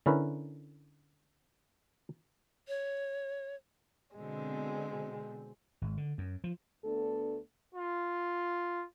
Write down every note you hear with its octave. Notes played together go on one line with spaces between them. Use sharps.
D3 C#4 E4 A#4 B4
C#5
B2 D3 G#3 C4
G#1
D3
F#2
F3
D2 A3 B3 D4 A4
F4